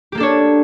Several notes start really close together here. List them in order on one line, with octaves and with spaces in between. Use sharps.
G4 A#3 A4 D4 C#5